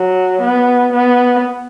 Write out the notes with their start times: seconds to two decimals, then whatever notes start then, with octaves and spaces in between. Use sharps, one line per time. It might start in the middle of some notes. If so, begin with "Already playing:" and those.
Already playing: F#3
0.41 B3
0.93 B3